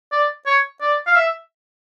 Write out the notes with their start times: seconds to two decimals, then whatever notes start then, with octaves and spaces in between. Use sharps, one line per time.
0.12 D5
0.46 C#5
0.81 D5
1.07 F5
1.16 E5